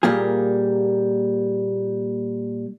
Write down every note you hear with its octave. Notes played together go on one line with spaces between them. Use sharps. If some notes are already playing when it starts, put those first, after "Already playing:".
A#2 G3 A#3 G4 G#4